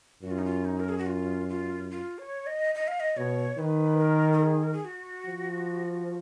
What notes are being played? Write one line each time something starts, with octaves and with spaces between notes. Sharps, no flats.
F#2 F#4
F4
D#4
F4
D#4
A#4
G#4
F#4
F4
F4
F4
C#5
D#5
D#5
F5
D#5
B2 C#5
D#3 B4
A#4
A#4
G#4
A#4
G#4
F#4
F3